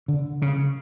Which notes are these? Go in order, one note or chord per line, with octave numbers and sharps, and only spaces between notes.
D3
C#3